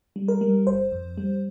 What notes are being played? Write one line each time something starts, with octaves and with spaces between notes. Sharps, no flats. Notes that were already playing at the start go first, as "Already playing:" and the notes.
G3
A#4
G3
G1 C5
F2
G3